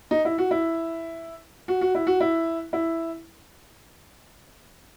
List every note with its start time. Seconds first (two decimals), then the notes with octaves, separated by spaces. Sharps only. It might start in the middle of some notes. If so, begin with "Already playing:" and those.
0.11 D#4
0.25 E4
0.38 F#4
0.51 E4
1.68 F#4
1.81 F#4
1.95 E4
2.07 F#4
2.20 E4
2.73 E4